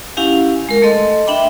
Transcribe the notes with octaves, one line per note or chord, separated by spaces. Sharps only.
C#4 E4 G4 F5 F#5 G#5
G#3 A#4
A3 A4 D#5 C6
D4 E5 G5 B5 D6